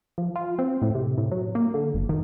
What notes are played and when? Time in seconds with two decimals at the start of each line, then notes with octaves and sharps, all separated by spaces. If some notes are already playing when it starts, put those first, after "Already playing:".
0.18 F3
0.36 F4
0.59 C4
0.82 A2
0.95 C3
1.18 A2
1.31 F#3
1.55 A#3
1.74 D3
1.94 F#1
2.09 D#3